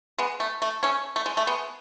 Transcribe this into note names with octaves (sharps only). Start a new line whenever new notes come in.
G#3 B3
A3
A3
A3 C#4
A3
G#3
A3
G#3 B3